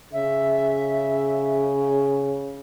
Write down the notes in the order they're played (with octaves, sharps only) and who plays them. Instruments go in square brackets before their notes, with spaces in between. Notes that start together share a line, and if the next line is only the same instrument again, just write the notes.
[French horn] C#3 [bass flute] E5